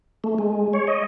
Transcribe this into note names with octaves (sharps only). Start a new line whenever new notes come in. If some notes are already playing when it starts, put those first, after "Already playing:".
A3
G#3
C#5
D#5